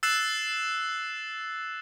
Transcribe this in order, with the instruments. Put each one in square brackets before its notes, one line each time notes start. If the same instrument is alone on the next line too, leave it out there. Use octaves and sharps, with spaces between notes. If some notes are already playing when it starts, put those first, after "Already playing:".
[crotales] E6 F#6 A6 C7 E7 F#7